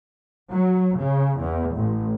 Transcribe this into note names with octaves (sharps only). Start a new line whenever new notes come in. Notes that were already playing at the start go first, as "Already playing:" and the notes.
F#3
C#3
E2
A1